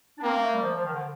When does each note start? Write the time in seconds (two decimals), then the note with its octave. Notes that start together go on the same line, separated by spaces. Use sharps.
0.18 D4
0.23 A#3 C4
0.36 A3
0.53 G3
0.62 F3
0.75 F3
0.84 D#3
0.94 D3